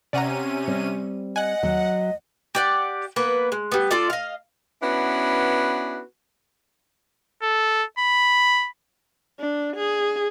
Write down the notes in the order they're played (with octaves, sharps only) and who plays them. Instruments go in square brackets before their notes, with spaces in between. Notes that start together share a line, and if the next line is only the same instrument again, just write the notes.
[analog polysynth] C3 C#4 D#7 [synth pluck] D5 F#5 A#5
[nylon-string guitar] G3 C4
[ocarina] D#5 [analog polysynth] F#5 [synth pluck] G#5 F#6
[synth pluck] D#2 [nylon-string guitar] F#3
[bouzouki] G4 D5 F#5
A#3 B3 B4
G#3
G3 B3
D4 F4 A4 D5
D#5 F5
[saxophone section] B3 C#4 D4 E4 F#4 B4
[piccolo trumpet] A4
B5
[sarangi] D4
G#4